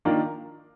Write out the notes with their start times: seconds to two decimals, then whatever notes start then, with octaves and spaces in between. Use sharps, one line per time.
0.05 D#3 A#3 D4 F4 A#4